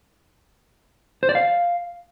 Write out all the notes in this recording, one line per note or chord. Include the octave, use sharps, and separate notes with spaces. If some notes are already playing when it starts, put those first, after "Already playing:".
C5
D5
F5